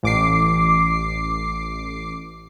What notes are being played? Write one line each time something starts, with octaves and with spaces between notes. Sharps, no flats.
A1 D6 C7